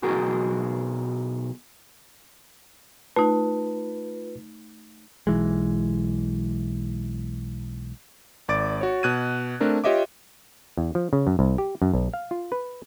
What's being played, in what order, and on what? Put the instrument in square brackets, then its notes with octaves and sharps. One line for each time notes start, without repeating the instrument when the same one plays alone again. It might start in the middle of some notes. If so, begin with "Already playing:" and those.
[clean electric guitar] B1 B2 F#4 G#4 A#4
[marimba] A3 D#4 [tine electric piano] F4 B4
[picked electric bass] B1 E3 G#3
[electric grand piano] G#1 D5 D6 A6 D7
F#4 C#5
B2 F#6 G#6 D#7
A3 C4 D4 A#4
F4 G4 C#5 D#5 E5 D6
[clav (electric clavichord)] E2
F3
C#3
F#2
C2
G4
F#2
B1
F5
F4
B4